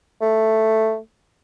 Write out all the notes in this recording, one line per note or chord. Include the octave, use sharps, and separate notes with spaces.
A3